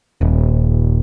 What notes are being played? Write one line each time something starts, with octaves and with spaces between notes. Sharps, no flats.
D#1